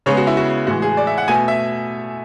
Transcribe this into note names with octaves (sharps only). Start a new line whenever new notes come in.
C#3 G#3 B3 C#5
F#4
E4
F#4
A2 E3 G#3 F#4
G#4
D5
E5
F#5
B2 A3 G#5
E5